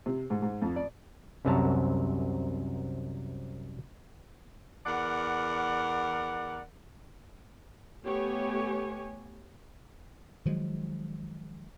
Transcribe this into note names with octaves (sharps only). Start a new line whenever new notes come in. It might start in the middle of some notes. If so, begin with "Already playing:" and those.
C3
G#2
G#2
F2
D5
C2 F#2 C3 F#3 A5 A#5
E2 A#4 D5 F#5
A3 B3 G4 C#5 G#5
D#3 F3 F#3 G#3